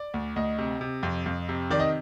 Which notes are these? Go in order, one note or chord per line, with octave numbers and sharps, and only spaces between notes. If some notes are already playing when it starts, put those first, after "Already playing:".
Already playing: D5
D2
D2 D#5
C3
C3
F2
F2
C3
D#3 D5
D#5